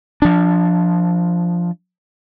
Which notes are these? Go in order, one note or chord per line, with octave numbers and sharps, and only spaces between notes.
F3 D4